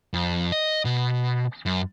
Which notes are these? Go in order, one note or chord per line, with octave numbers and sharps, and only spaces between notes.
F2
D#5
B2
F#2